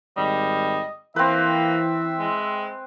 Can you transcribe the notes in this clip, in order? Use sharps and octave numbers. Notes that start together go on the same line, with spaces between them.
G#1 G3 D#5
E3 A#3 C4 B4 E5
G#3